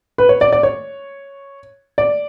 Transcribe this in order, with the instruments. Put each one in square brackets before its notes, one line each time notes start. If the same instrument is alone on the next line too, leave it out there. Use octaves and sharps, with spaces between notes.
[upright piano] B4
C#5
D5
D5
C#5
D5